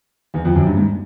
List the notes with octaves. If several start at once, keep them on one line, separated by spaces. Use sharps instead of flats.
E2
F2
F#2
G2
G#2